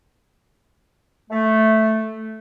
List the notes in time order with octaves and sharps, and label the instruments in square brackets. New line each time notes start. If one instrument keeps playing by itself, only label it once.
[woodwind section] A3